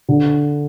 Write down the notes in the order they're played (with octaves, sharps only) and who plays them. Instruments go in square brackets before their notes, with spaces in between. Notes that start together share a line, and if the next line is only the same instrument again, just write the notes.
[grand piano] D3